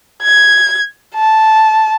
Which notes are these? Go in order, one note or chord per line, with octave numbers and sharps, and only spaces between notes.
G#6
A5